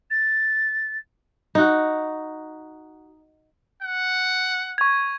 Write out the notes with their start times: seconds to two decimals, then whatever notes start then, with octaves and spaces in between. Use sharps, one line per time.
0.10 A6
1.55 D#4 F#4
3.82 F#5
4.78 C#6 G#6